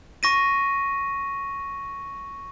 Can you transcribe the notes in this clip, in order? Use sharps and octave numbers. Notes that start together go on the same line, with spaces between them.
C#6 A#6 D#7